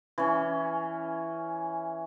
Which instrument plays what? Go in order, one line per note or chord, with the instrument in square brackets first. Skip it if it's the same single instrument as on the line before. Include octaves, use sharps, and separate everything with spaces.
[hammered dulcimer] E3 C#4